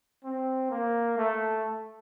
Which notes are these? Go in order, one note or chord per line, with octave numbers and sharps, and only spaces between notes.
C4
A#3
A3